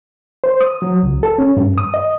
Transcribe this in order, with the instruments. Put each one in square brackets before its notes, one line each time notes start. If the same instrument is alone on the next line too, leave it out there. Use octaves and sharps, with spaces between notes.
[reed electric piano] C5
D#6
F#3
C#2
A4
C#4
G2
D#6
D#5